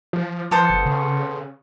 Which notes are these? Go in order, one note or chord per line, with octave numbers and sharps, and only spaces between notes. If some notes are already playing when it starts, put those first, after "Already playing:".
F3
F3 B3 A4 C5
F#1
C#3